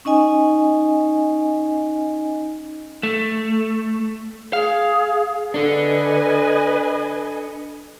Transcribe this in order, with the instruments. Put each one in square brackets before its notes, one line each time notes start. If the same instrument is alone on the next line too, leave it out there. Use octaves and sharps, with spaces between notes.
[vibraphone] C#4 D#4 D#5 G#5
[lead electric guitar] A3
[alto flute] G#4 [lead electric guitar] F5
[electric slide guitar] D4 A4 [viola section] B4 D#5 G#5